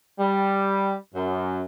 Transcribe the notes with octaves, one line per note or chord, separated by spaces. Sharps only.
G3
F#2